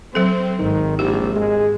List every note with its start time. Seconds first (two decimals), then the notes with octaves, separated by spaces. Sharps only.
0.15 F#3 C4 A4
0.59 G#1 D#3
0.99 A#1 G4
1.36 G#3